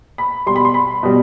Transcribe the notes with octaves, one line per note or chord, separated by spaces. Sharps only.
B5
B2 G3 C6
B5
C6
B5
B2 G3